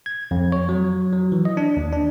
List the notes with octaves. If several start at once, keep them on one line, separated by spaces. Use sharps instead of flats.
G#6
F2
C#5
F#3
F#3
E3
D#5
D4
D#2
D4